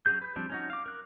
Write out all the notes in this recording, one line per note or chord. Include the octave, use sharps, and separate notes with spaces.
F#3 C#4 F#4 G#4 G6
B4
F3 G3 C4 D4
C#4 D#4 F#4
F5 D6
A#4 F#6